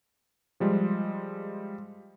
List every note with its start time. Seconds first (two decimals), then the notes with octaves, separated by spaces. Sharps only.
0.60 F3 G3 G#3